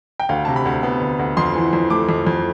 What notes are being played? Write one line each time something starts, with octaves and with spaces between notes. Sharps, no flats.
G5
D2 F5
C3 A5
B5
D2
B3
D2
D2
F2 C6
E3
F2
A3 D6
F2
F2